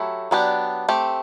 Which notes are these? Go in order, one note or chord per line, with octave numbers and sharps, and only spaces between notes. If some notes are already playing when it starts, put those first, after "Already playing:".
Already playing: F#3 A3 E4 G4
F#3 B3 D4 G4
A3 C4 G4